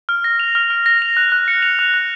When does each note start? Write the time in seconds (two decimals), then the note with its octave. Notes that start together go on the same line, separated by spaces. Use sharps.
0.09 F6
0.24 A#6
0.40 F7
0.55 F6
0.70 F6
0.86 A#6
1.02 F7
1.17 F#6
1.32 F#6
1.48 C#7
1.62 F7
1.79 F#6
1.94 F#6